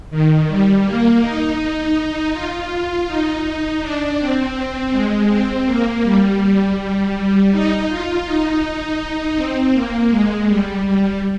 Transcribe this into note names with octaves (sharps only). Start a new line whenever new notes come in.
D#3
G3
A#3
D#4
F4
D#4
D#4
D4
C4
G#3
C4
A#3
G3
G3
D#4
F4
D#4
C4
A#3
G#3
G3
G3